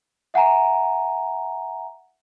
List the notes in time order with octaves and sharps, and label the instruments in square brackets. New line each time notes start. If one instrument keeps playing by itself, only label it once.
[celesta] E5 F#5 G#5 A#5